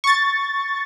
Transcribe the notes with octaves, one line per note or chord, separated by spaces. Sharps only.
C#6 A6